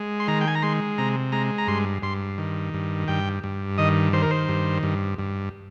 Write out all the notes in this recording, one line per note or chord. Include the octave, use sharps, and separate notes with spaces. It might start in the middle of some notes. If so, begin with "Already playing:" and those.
Already playing: G#3
C6
D#3 A#5
G5
G#5
A#5
G#3 C6
C3 A#5
G#3 A#5
A#5
G2 C6
G2 C6
D#3
G2
G2 G5
G2
D#3 D#5
D#3 C5
A#4
C5
G2
G2
G2